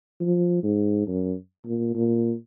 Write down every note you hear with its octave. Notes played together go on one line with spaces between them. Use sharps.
F3
G#2
F#2
A#2
A#2